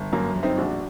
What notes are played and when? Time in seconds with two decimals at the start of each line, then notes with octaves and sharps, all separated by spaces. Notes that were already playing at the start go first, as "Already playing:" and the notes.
Already playing: G1
0.13 F#2 A#3
0.35 G1
0.43 C4 D#4
0.57 A#1 D4 F#4